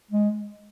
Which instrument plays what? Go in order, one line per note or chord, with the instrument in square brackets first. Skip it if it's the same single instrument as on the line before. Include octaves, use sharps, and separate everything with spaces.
[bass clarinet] G#3